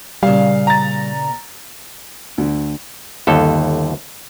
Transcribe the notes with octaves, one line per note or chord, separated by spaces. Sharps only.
A#2 C#3 G3 F5
A#5 A6
D2
G1 D#2 A4